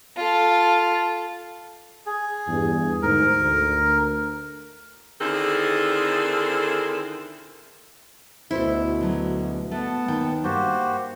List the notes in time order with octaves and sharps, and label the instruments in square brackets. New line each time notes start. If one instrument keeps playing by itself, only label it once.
[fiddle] F4 A4
[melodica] G#4
[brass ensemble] E2 G2
[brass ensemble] D2 G#2 [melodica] A#4
[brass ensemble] D2
[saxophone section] D3 D#3 C4 E4 G#4 A4
[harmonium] D2 B2 [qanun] E4 [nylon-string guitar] A4 B4 C5
[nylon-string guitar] D3 F#3 G#4
[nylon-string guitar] A3 [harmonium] B3 F#5 [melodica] A5
[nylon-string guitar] D#2 D#3 G5
[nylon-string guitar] G2 [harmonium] A#3 [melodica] F#4 G4 C5